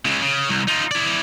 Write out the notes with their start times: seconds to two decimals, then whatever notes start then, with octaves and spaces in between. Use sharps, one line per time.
0.05 C#3 G#3
0.22 C#3
0.50 C2
0.68 D#4 F4
0.91 E4 D5